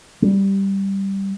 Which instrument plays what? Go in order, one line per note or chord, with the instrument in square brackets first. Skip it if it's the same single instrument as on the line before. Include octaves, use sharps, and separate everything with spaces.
[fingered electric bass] G3